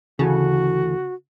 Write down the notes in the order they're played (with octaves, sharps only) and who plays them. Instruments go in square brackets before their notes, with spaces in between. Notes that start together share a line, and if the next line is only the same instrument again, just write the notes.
[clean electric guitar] D2 E3 A4 [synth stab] C#3 [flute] F#4